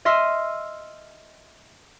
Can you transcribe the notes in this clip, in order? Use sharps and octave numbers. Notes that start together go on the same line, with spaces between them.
D#5 E5 C6 E6 F6